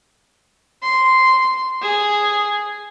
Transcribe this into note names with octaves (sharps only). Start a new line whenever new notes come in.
C6
G#4